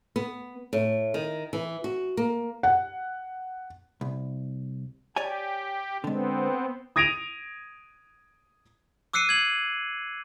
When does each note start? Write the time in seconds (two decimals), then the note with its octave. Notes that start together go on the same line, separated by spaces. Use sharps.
0.16 B3
0.73 A2
1.14 D#3
1.53 E3
1.84 F#4
2.17 A#3
2.63 F#5
4.01 C2
5.16 G4 C#5 D5 G#5
6.04 D3 G#3 B3 C4
6.96 D#6 G#6 A#6 D7 D#7 F7
9.13 D6 E6 F#6 C7 C#7 D#7
9.29 G#6 F#7